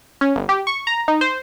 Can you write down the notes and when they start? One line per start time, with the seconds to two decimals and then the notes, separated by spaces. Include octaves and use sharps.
0.21 C#4
0.36 G1
0.49 G4
0.67 C#6
0.87 A#5
1.08 D#4
1.21 C5